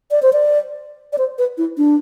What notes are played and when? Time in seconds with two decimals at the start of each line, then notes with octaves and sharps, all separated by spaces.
0.11 D5
0.23 C5
0.33 D5
1.13 D5
1.18 C5
1.38 B4
1.58 E4
1.78 D4